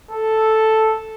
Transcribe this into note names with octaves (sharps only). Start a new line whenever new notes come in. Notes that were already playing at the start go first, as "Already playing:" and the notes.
A4